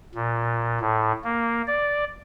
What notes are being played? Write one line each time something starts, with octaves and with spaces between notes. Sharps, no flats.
A#2
A2
A#3
D5